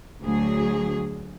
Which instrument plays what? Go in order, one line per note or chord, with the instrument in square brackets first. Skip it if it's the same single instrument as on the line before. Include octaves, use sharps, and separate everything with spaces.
[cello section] D2 F#3 G#4